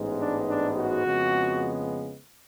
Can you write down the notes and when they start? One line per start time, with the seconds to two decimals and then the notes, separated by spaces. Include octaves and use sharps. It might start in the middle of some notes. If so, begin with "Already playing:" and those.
Already playing: A1 G#2 G#3 B3
0.19 D4
0.48 D4
0.76 F#4
1.04 F2 C#3 G#3 B3